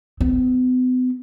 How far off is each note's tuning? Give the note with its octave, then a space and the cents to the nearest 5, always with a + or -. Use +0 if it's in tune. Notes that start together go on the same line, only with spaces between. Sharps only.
B3 +45